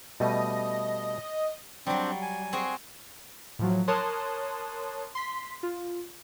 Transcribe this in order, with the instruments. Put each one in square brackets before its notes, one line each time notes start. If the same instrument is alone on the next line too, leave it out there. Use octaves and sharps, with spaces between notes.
[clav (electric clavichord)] B2 G3 A3 [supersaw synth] D#5
[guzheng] F#3 G3 [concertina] C4 D4
[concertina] G#5
[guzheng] C4 F#4 G#4
[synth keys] A2 F3 F#3
A#4 C#5 A5 C6 D#6 F#6
C6 B6
F4